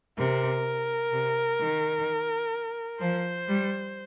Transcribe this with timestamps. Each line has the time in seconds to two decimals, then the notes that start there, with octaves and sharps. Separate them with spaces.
0.17 C3 A#4
1.12 C3
1.60 D#3
3.00 F3 C5
3.48 G3